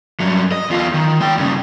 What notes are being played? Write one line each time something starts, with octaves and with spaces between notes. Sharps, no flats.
G2 F#3
D#5
E2 F4
D#3
G#3 G5
G2 C#3